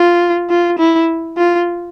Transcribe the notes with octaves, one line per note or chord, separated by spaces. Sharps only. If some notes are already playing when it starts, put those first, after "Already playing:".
Already playing: F4
F4
E4
F4